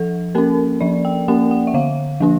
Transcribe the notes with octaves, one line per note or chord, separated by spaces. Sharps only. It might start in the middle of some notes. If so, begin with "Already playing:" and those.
Already playing: F3 A4
A#3 C#4 A#4
F3 D5
G5
A#3 C#4 F#5
F#5
E5
D3 F5
F3 A#3 D4